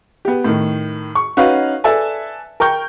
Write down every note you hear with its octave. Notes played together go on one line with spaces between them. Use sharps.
B3 G4
A2 D#3
C#6
C#4 D#4 F#4 B4 D#5 F5
A4 B4 D5 E5 G#5 A5
A#4 G5 C#6 G6